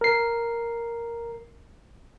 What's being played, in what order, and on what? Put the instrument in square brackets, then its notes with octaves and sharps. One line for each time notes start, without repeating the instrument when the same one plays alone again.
[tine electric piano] A#4 C7